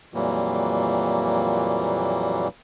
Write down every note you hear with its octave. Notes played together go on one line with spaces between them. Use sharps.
F2 A#2 E3 F#3 G3 A#3